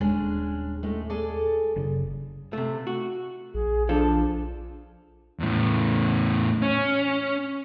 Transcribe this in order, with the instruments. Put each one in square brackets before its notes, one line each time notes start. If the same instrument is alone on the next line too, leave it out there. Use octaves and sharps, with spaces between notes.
[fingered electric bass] D#1 [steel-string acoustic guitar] G#3 C#4 D4
[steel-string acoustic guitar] A2 G#3 A3
G#4 A4 D5
[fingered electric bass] F#1 C#3
[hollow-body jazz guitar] C3 A3
F#4
[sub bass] A#1 [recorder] G#4
[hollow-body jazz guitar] F3 A4 [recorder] D4
[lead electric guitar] E2 A2
C#4